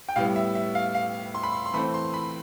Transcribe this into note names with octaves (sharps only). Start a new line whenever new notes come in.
G5
A2 G3 B3 F5
E5
E5
F5
F5
C6
B5
C6
C6
E3 A3 C4 B5
C6
B5